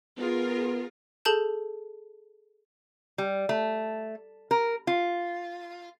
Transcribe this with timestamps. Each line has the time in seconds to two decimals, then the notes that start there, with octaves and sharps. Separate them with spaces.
0.19 B3 F4 G#4 A#4
1.25 G#4 A4 A5 G6 E7
3.18 G3
3.49 A3
4.51 A#4
4.87 F4